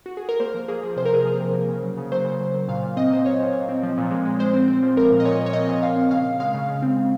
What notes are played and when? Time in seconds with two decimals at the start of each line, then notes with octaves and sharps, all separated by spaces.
0.06 F#4
0.17 G#4
0.29 A#4
0.40 A#3 C5
0.54 F3
0.68 A#3 G#4
0.83 F3
0.96 C3 C5
1.05 A#4
1.11 C3 G#4
1.22 F3 A#4
1.40 C3
1.54 A#3
1.69 C#3
1.82 F#3
1.98 C#3
2.12 F#3 C5
2.25 C#3
2.40 F#3
2.54 F#3
2.68 A#2 F5
2.82 A#2
2.97 C4 D#5
3.11 A#2 C5
3.25 A#2 C#5
3.40 A#2
3.53 A#2
3.69 C4
3.83 F3
3.97 A#2
4.11 G#3
4.25 G#3
4.39 G#3 C5
4.54 C4
4.68 C4
4.83 F3
4.97 C4 A#4
5.11 A#2
5.20 D#5
5.25 A#2 C#5
5.39 A#2
5.46 C#5
5.53 C4 D#5
5.69 A#2
5.82 A#2 F5
5.96 C4
6.11 C#3 F5
6.26 C#3
6.40 G#3 F5
6.54 C#3
6.69 C#3
6.82 C4
6.97 C#3